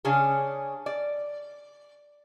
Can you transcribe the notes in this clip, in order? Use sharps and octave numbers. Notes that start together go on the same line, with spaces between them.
C#3 C#4 D4 G#4
D5